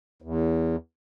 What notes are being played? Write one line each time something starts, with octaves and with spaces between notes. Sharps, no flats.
E2